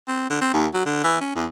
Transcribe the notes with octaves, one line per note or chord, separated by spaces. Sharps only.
C4
D3
C4
D#2
F#3
D3
E3
C#4
E2